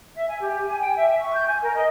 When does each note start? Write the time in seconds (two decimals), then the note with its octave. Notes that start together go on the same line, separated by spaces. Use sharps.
0.15 E5
0.28 G#5
0.40 G4
0.64 G#5
0.80 G5
0.95 E5
1.08 E5
1.20 C#6
1.33 G6
1.47 G#5
1.61 A#4
1.75 D#5